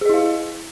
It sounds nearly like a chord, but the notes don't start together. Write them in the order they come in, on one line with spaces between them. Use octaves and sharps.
G#4 D#5 E4 F5